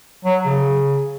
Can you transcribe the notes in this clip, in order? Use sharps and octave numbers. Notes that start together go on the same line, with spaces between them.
F#3
C#3